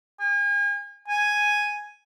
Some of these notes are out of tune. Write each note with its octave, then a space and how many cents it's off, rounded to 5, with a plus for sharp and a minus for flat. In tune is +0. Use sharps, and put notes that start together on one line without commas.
G#5 -40
G#5 +0